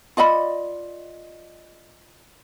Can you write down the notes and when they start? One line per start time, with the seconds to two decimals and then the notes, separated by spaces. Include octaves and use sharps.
0.17 F4 D5 D#5 B5